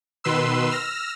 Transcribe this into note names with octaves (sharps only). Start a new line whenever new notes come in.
B2 D#3 B4 C6 E6
E6 F6 A#6